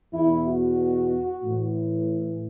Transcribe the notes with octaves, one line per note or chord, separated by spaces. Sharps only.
E2 B2 E4
F#4
A2 E3